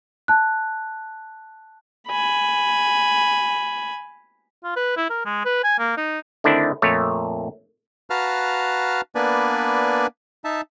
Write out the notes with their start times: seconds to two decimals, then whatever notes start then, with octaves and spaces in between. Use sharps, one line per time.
0.28 A5 F#6
2.08 G#5 B5
4.64 F4
4.76 B4
4.97 E4
5.10 A#4
5.25 G#3
5.45 B4
5.64 G#5
5.79 A#3
5.97 D#4
6.44 D3 D#3 A3 C4 D4 E4
6.82 F2 A#2 A3 C#5
8.10 F#4 B4 F5 A5 A#5 F6
9.15 A#3 B3 D4 B4 D5 G#5
10.44 D#4 E5 A5